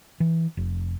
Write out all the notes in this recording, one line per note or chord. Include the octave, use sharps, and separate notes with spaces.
E3
F1